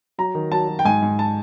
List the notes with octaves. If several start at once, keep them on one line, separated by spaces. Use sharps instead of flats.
F#3 A#5
D#3
F#3 A5
F#3
G5
G#2 G#5
G#2
A5